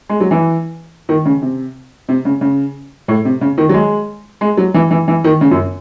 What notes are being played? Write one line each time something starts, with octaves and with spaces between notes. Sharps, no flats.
G#3
F#3
E3
D#3
C#3
C3
C3
C#3
C#3
A2
C3
C#3
D#3
F#3
G#3
G#3
F#3
E3
E3
E3
D#3
C#3
F#2